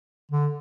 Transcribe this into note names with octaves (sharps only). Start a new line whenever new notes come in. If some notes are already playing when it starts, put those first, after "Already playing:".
D3